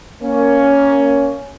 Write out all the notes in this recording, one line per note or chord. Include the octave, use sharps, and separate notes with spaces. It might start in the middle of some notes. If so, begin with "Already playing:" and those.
A#3 C#4